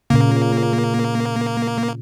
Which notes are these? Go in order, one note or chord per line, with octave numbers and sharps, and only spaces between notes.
A#2 C#3 A#3